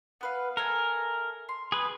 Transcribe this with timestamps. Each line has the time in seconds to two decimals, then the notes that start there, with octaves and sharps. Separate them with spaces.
0.21 B3 B4 F5
0.57 A4 A#4 E5 G#5
1.49 C6
1.72 G#4 B4